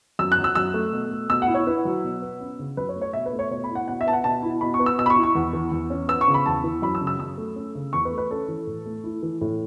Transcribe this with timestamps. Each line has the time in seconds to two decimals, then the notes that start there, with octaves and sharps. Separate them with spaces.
0.19 F#2 E6
0.32 F#6
0.38 F#3
0.44 E6
0.55 F#2 E6
0.74 A3
0.92 B2
1.11 A3
1.29 B2 E6
1.42 F#5
1.47 E4
1.54 C#5
1.67 E4 B4
1.85 F#3
2.04 B2
2.22 B3
2.40 C#4
2.59 C#3
2.77 F#2 B4
2.89 C#5
2.95 A3
3.02 C#5
3.13 B2 E5
3.26 B4
3.33 A3
3.39 C#5
3.50 B2 C#5
3.64 B5
3.70 E4
3.75 F#5
3.88 B2 F#5
4.01 E5
4.06 B3 A5
4.13 F#5
4.24 B2 A5
4.43 E4
4.61 B2 B5
4.74 C#6
4.79 B3
4.86 E6
4.99 B2 E6
5.06 B5
5.10 C#6
5.16 E4
5.23 C#6
5.35 E2
5.53 E3
5.72 E2
5.90 C#4
6.08 B3 E6
6.21 C#6
6.28 C#3
6.34 B5
6.46 E2 A5
6.64 E3
6.82 F#2 B5
6.95 E6
7.01 C#3
7.07 E6
7.19 F#2 E6
7.38 A3
7.56 C#4
7.75 C#3
7.93 E2 C#6
8.05 B4
8.11 A3
8.18 B4
8.30 C#4 A4
8.48 E3
8.67 A2
8.86 A3
9.04 E4
9.23 E3
9.41 A2